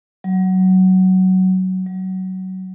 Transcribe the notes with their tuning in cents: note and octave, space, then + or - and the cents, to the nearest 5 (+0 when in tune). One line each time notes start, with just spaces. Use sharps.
F#3 +15
F#3 +25